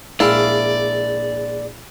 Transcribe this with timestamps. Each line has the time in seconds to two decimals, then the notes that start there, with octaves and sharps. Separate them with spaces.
0.20 A#1 G#3 E4 D5 F5 G5